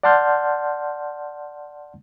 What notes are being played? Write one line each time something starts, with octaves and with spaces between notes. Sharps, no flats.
D5 F#5 A5 C6 F6 G6